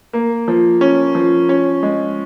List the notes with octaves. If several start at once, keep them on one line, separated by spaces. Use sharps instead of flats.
A#3
F3
C#4
F3
C#4
G#3